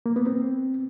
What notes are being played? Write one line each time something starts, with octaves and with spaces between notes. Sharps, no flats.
A#3
B3
C4